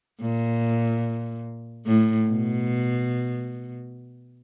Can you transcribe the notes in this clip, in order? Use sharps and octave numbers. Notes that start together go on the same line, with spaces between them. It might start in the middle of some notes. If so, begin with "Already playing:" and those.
A#2
A2
B2